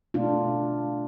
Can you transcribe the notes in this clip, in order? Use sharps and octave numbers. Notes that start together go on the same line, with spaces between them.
B2 A3 D4 F4